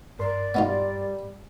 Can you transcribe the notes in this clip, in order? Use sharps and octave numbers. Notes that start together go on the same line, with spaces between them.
G2 A#4 D5 C6
G3 B3 D#4 F4